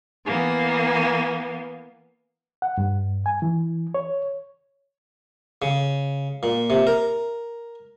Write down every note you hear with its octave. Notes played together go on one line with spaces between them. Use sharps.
E3 A#3 B3
F#5
G2
G#5
E3
C#5
C#3
A#2
C3
A#4